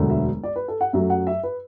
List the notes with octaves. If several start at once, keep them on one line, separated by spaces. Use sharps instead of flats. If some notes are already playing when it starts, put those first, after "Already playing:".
Already playing: E1 D2 D3 F#3 A3
E5
D5
B4
A4
F#5
F#2 F#3 A3 E5
F#5
E5
B4